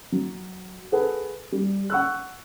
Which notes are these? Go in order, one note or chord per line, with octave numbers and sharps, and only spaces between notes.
F#3
G#4 A4 B4 F#5
G3
F#5 C#6 E6 F#6